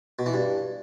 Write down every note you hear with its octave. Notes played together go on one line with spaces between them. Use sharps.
B2
E3
G2